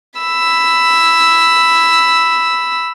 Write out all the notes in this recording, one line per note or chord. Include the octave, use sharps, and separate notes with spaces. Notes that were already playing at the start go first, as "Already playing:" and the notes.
B5 E6